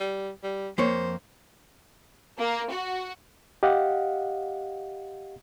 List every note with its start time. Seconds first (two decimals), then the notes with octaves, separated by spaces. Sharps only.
0.01 G3
0.44 G3
0.78 F2 A#3 C5 C#5
2.38 A#3
2.71 F#4
3.63 G4 D#5 F5 F#5